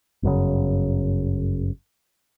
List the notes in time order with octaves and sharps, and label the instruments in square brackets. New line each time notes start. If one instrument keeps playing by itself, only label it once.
[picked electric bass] G1 F#2 C#3